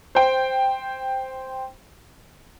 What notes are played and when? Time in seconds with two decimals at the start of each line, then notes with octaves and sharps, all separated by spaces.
0.15 C5 G5